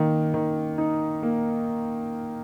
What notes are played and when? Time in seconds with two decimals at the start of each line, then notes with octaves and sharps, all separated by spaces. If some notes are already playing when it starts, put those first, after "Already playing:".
Already playing: D#3 A#3
0.34 D#3
0.78 D#4
1.22 A#3